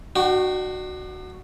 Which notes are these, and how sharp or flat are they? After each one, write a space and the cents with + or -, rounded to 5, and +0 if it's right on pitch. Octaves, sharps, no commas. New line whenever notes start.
D4 +40 F#4 +0 G5 -35